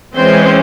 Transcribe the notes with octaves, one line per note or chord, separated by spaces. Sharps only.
E3 G#3 C4 C#4 C5